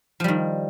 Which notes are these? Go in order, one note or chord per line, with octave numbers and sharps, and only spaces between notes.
D#3 F3 G3